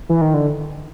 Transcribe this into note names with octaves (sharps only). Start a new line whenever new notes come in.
E3
D#3
D3